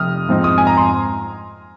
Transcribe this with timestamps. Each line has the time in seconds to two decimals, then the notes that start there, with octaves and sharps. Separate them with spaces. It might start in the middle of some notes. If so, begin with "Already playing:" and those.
Already playing: F1 F2 C3 D#6 F6
0.29 G#2 F3 C4 D#4
0.44 D#6
0.58 G#5
0.67 A#5
0.77 C6